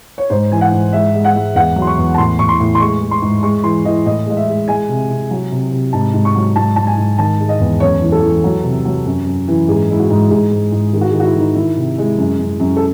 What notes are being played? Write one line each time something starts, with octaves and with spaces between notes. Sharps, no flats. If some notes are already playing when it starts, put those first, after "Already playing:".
C#5
G#2 C5
E3 G#5
F#5
G#2
G#3 E5
G#3
F#5
G#3
E2 F#5
F#3
C6
C#6
E2
A5
A2 C6
A2 C#6
C6
A2
C6
G#3 C#6
G#3
C6
G#2
G#3 C#6
E3 C6
E3 D#5
A2 D#5
G#3 D#5
E5
G#3
G#3 G#5
C3
C3
F#3
C3
C3
G#2 A5
G#2
C#6
F#3
G#2 A5
G#2 A5
G#5
G#2
D#3 A5
G#3
D#5
E2
F#2 C#5
E3
A4
E3
F#3
C3
F#3
F#2
F#2
E3
G#2 G#4
G#3 E4
F#4
G#2
G#2 G#4
G#2
G#2
D#3 G#4
F#4
G#4
D#3
F#4
E4
D#3 D#4
D#3 E4
C3
G#3
F#2
F#2
F#2
A4